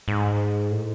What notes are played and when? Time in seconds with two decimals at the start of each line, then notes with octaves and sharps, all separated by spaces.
0.08 G#2
0.71 A2